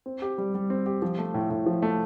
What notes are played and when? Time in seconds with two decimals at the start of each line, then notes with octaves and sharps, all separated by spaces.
0.06 C4
0.22 G4
0.38 G3
0.54 G3
0.70 C4
0.86 G4
1.02 F3
1.18 A3
1.34 A2
1.50 A2
1.66 F3
1.82 A3